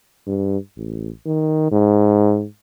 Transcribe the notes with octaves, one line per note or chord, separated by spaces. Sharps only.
G2
A1
D#3
G#2